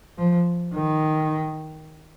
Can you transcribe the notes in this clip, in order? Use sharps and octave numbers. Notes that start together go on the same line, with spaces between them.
F3
D#3